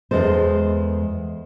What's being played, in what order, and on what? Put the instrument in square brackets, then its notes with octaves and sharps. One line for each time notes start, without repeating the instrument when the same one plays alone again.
[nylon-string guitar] E2 G#3 A4 C5